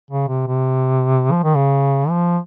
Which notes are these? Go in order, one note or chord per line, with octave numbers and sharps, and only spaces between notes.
C#3
C3
C3
F3
D#3
C#3
F3